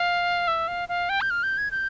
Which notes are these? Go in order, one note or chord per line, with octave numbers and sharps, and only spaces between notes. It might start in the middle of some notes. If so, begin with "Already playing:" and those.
Already playing: F5
E5
F5
F5
G5
G6
F6
G6
G#6
G6